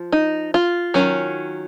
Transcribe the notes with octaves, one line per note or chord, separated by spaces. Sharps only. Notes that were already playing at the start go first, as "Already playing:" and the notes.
Already playing: F3
D#4
F4
D#3 F#3 C#4